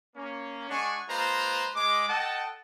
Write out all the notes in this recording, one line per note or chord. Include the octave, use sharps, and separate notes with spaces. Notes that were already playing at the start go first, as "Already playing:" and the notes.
A#3 C#4
G#3 D4 F#5 G#5 C#6
G#3 A#3 F4 B4 C5 A#5
G#3 D6
A4 D#5 F#5 G5 A5